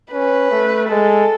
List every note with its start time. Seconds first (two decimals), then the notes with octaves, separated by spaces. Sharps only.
0.12 C#4 B4
0.52 A3
0.90 G#3 A4